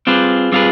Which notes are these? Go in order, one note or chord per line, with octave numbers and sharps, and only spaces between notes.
G3 C4 F4 G#4 B4
G3 C4 F4 G#4 B4